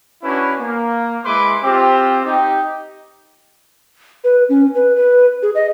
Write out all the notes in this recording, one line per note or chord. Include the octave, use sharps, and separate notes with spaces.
C#4 D4 E4 F#4 B4
A#3
G#3 E4 B4 C6 D6
C4 F4 G4
D#4 G4
B4
C#4
B4
B4
G#4
D#5